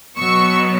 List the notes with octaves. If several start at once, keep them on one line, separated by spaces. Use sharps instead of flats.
B2 F#3 B3 C#6 E6